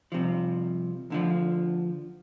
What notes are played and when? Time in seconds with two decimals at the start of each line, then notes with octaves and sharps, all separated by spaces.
0.12 C2 C3 F3
1.10 D2 D3 F3